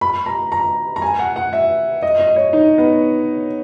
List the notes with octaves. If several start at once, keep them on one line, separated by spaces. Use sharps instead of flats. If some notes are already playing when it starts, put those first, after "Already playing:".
B5
A#5
A#5
A#5
G#5
F#5
F#5
E5
D#5
D#5
C#5
D#4
B3